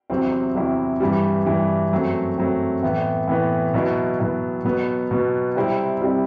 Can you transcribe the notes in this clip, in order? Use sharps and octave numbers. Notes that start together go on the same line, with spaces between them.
E2 C3 F#3 C4 E4
E2 C3 F#3 C4 E4
G2 E3 G3
G2 E3 G3
F#2 F#3 A3 C4
F#2 F#3 A3 C4
A2 E3 B3
A2 E3 B3
B2 F#3 B3 E4
B2 F#3 B3 E4
B2 F#3 B3
B2 F#3 B3
C3 G3 C4 E4
C3 G3 C4 E4